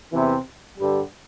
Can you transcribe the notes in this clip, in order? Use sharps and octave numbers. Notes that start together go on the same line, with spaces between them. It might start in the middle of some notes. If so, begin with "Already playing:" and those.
E2 C3 E3
G2 D3 G3